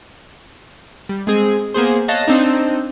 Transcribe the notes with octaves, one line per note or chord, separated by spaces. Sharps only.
G3
G#3 C4 G#4
A#3 B3 G#4 C5
C#5 D#5 F5 A5 F#6 A#6
C4 D4 D#4